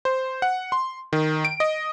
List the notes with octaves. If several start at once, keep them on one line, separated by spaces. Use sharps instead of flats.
C5
F#5
C6
D#3
D7
D#5